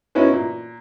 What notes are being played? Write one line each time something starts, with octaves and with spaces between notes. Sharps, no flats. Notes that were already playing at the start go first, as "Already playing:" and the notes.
B3 C#4 D#4 E4 F#4
A#2